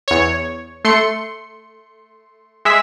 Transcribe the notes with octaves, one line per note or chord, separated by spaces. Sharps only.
E2 C#5
A3 C6 C#7
G#3 E5 B6